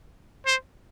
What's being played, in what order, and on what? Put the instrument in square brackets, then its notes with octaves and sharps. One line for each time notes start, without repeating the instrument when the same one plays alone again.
[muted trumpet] C5